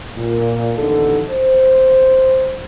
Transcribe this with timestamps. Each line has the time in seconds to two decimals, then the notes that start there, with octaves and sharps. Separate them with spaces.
0.17 A#2
0.77 A1 D#2 D3 D#4 A4
1.29 C5